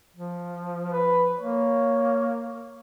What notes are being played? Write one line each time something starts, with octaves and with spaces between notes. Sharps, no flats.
F3
B4
A#3 C#5